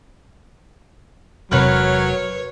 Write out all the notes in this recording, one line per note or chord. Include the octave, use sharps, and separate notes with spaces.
E1 C3 F#3 A#4 B4 C#5 F#6